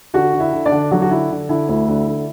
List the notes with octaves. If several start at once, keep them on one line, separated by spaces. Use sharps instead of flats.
D3 F#4 F#5
D3
E4 E5
D3
D4 D5
D3
D3 F#3 F#4
F#4
D3 E4
D3
D3 E4
D2 E4
D3
D3